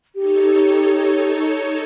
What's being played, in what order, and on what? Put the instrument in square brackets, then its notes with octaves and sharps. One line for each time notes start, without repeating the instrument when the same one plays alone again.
[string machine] D#4 A4 C#5 [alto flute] G4